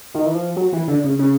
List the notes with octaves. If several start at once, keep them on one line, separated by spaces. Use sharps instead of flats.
D#3
E3
F3
F#3
E3
D3
C#3
C#3